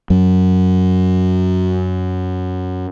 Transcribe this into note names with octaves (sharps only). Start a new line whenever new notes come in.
F#2 F#3